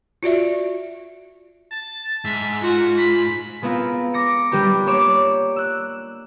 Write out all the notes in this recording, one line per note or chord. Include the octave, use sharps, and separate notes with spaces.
F4 F#4 D5 E5
A5
G#2 E5
F4 F#4
B5
G#3 B3 C4 F4 A#4
D6 A#6 C#7
G3 D4 G4 A#4 B4
A#3 C#5 D6 E7
E6 F#6